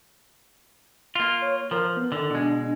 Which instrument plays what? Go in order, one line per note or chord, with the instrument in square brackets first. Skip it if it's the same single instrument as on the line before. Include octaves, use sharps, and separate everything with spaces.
[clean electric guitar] A#3 F4
[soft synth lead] C#5
[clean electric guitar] F3 [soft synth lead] A#4
[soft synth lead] B3
[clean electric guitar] D3 [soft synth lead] D#3
[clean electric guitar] B2 G#3 [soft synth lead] D4